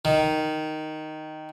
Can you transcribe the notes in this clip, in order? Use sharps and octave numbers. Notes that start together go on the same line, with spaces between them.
D#3